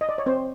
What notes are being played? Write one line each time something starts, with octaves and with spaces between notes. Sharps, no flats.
D#5
D5
C#5
C4 C5